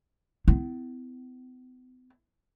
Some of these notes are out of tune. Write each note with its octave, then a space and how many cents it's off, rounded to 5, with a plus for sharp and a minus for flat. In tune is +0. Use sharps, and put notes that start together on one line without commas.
B3 +45 E4 +0